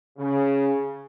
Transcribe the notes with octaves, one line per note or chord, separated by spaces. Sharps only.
C#3